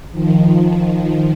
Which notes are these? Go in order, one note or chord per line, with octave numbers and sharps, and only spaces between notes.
D#3 F3